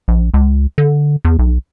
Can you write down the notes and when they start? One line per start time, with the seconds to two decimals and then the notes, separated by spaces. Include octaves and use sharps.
0.08 A#1
0.34 C#2
0.78 D3
1.25 E2
1.39 B1